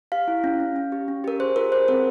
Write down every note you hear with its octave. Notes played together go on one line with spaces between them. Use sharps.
G4 F5
E4
C#4
C#4
C#4
G4
C#4
G4 A#4
G#4 C5
F4 A#4
G#4 C5
C4 A#4